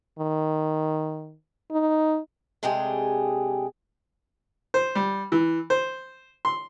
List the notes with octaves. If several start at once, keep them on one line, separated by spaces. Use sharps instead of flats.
D#3
D#4
C3 G#3 A3 D4 G4 G#4
C5
G3
E3
C5
C6